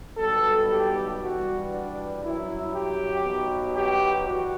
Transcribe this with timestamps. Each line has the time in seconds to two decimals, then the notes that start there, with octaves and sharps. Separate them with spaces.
0.18 B1 B2 G3 A4
0.69 G4
1.20 G2 E3 G3 F#4
1.71 D4
2.22 F#2 F#3 E4
2.73 G4
3.24 B1 B2 F#3
3.74 G4
4.26 G2 E3 G3 F#4